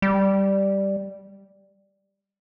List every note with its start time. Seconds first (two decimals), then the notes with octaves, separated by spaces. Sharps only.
0.02 G3